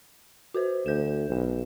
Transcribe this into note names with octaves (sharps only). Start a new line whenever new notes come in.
F#4 B4 C5
D2 G6 E7
B1